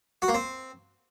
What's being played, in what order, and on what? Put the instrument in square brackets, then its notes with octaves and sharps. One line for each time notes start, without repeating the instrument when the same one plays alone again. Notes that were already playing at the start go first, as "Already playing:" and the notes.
[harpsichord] F#4
A#3
C4